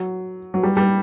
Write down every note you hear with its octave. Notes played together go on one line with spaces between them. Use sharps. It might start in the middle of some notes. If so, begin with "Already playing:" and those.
Already playing: F#3
F#3
G3
G3